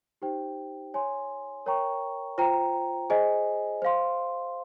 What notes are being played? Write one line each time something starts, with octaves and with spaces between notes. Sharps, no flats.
D#4 G4 C5 G5
C#5 G#5 C6
A#4 C#5 G5 A#5 C#6
F4 C5 G5 A#5
G#4 C5 D#5 G#5
C5 F5 C6